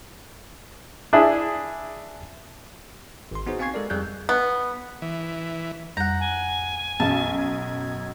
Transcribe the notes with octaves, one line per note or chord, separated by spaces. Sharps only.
D4 E4 G#4
G#1 C6
B3 D#4 F#4 G#4 C5
C4 F5 G#5 C#6 G#6 C7
G#3 A4 A#4 D5
F2 G3 G#4 F#6 G6
B3
E3
F2 G3 F#5 A#5 G6
G#5
B1 F#2 A5
G#6